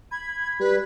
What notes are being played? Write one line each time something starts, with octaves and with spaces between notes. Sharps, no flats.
B5 G#6
G3 B4